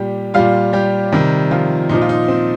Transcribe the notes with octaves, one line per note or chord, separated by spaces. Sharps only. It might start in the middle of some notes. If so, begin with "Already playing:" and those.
Already playing: A#2 G3 G4
A#2 G3 F4 F5
G3 G4
C3 D#3 G3
F3 F4
A#2 F3 D#4
F4
D#4
C4